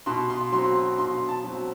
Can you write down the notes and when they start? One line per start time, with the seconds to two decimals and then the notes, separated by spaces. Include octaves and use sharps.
0.06 B2 C6
0.30 C6
0.52 F#3 C4 C6
0.75 C6
0.98 B2 C6
1.29 A5
1.44 F#3 C4